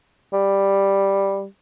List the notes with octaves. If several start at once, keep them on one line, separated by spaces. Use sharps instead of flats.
G3